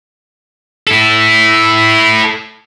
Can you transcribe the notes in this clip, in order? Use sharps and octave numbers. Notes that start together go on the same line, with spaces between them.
E4 A4